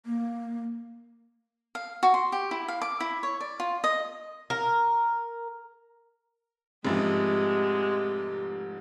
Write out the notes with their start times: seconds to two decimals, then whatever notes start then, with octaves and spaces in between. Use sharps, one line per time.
0.06 A#3
1.75 F5
2.03 F#4
2.14 C6
2.32 G4
2.51 E4
2.68 F5
2.82 D6
3.00 E4
3.23 C#5
3.41 D5
3.60 F4
3.84 D#5
4.50 A#4
6.85 F1 G#2 C3 F3 G#3 G4